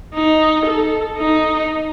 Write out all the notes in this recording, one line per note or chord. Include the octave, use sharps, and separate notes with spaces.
D#4
A4
D#4